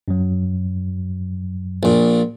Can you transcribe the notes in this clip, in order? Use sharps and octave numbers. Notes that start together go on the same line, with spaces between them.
F#2 F#3
A#1 A#2